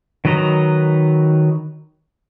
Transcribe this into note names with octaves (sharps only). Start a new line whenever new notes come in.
D#3 F#3 B4 D#5 A#5